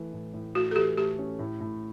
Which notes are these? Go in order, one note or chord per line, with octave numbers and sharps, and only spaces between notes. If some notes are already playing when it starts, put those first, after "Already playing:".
Already playing: E3 A3
A2
A2
A3 F#4
A4
E3 G4
A3 G4
C#4
A2
A2